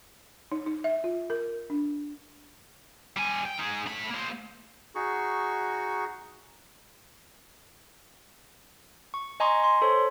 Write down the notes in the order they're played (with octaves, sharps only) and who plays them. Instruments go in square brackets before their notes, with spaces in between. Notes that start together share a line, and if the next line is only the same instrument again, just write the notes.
[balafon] D#4
D#4
E5
F4
A#4
D4
[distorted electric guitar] G3 G#5
G5
D#4 G#4
A2 B5
A#3 C5
[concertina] D#4 F#4 G#4 C#6
[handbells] C#6
D#5 G#5 A#5 C6 C#6 D#6
C6
A4 C5 C#5